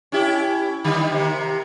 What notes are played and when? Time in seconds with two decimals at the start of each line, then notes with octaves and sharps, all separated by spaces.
0.12 C#4 E4 G4
0.84 D3 D#3 G3
1.12 C3 A#3